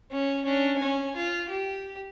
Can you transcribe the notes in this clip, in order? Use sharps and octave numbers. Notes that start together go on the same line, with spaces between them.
C#4
C#4 D4
C#4 G#5
F4
G4